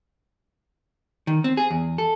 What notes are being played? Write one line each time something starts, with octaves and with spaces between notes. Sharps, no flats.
D#3
C4
G#4
E2
A4